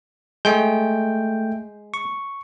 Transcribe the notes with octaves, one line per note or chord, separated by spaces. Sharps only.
G#3 A3 G5 G6
C#6